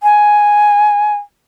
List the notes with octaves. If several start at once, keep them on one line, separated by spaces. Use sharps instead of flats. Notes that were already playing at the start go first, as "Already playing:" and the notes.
G#5